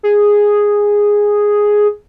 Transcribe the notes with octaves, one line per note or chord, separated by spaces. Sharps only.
G#4